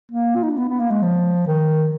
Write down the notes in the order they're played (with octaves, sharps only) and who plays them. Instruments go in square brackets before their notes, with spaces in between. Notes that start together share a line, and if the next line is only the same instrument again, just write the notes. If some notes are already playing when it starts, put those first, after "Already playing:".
[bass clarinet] A#3
F4
D#4
D4
B3
B3
A#3
G#3
F3
D#3